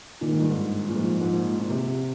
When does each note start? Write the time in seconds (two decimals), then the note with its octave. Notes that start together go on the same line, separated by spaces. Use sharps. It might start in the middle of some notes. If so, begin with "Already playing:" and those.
0.21 A#2 D#3
0.31 G#2
0.40 G2
0.49 G#2
0.89 A#2
0.96 G#2 F3
1.21 G#2
1.33 A#2
1.60 A#2
1.70 C3